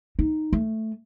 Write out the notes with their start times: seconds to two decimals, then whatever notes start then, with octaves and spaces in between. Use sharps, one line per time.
0.19 D#4
0.53 A3